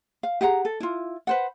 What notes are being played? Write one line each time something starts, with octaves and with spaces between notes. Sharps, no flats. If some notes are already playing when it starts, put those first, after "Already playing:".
F5
G4 G#4 F#5 A#5
A4
E4 F4
B4 C5 F#5